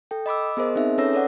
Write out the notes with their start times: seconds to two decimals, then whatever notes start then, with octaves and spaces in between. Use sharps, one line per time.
0.11 A4 G5
0.26 D#5 B5 D6 E6
0.57 B3 G#4 A#4 C5 D#5
0.75 C4 D#4 G#4 E5
0.98 C#4 A4 B4 C#5 E6 A#6
1.13 A4 C#5 D5 F#5